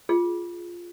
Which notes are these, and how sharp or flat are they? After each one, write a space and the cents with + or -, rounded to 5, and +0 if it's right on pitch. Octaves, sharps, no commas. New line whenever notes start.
F4 +0 G#4 +0